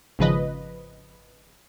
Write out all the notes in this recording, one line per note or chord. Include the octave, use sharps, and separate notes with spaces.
G#1 C#3 F3 B4 D#5